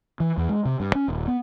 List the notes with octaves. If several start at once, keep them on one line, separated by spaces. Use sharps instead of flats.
E3
E2
G#3
C3
G2
C#4
D#1
B3